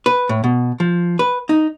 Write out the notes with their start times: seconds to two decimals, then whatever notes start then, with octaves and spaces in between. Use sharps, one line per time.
0.06 B4
0.29 A2
0.44 B2
0.80 F3
1.19 B4
1.49 D#4